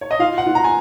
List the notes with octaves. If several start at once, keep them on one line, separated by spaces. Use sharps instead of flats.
C#5
D#5
F4 F5
F#5
F4
A#5
G#5